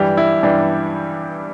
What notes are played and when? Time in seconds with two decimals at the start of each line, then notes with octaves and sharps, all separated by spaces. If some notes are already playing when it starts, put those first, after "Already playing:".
Already playing: G2 E3 G3 G4
0.17 E4
0.43 G2 E3 G3 D4